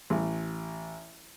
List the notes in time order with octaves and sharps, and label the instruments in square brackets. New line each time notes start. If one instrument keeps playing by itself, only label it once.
[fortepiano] A1